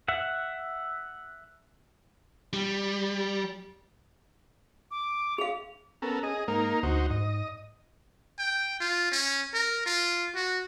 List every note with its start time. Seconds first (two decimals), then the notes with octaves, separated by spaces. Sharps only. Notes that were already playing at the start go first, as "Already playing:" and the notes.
0.08 E5 F#5
2.53 G3
4.91 D6
5.38 G#4 F5 F7
6.02 B3 C#4 A4 A#4
6.23 G#4 D#5
6.48 G#2 A#3 D#4 A#4
6.83 D2 D#4 F#4 C5
7.10 G#2 D#5
8.39 G5
8.80 F4
9.12 C#4
9.54 A#4
9.86 F4
10.35 F#4